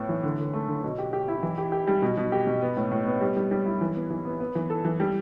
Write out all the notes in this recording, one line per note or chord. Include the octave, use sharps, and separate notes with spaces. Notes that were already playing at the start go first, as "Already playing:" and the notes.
Already playing: A2 B3
E3
D3
D3
A3
D3
B2
G4
G4
E4
E3
G4
G4
G3
B2
B2
G4
B2
B3
A2
A2
B3
G3
G3
G3
E4
E3
B3
E3
B3
B3
E3
A4
E3
G3